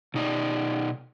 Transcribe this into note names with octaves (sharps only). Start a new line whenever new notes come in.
B2 D#4 D5